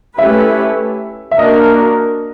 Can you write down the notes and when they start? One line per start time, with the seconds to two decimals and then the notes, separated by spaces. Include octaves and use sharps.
0.18 A3 C#4 E4 G4 B4 E5
1.31 E5
1.39 A#3 D4 F#4 A#4 D#5